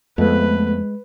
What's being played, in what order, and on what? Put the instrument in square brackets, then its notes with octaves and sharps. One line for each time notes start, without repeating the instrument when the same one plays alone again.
[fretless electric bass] F2 [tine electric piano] G#3 [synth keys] A3 B3 [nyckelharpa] B4